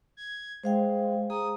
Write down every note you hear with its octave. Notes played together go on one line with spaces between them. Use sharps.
G#6
G#3 C5 F5 G5
G#4 A#5 D#6